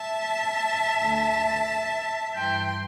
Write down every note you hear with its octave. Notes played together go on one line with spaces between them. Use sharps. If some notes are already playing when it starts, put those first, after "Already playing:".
Already playing: E5 A5
D2 D3 A3
G2 E3 G3 G5 C6